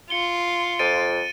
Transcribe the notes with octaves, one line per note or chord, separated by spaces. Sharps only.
F4 C#7 G7
F2 A6 D7 D#7